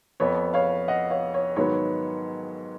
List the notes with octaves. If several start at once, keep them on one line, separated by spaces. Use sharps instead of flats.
F2 F3 B3 C#5
C#5 F5
D#5 F#5
C#5 F5
C#5
G#2 D#3 F#3 B3 C#5